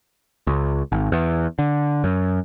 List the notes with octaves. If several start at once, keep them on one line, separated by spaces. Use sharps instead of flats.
C#2
G#1
E2
D3
F#2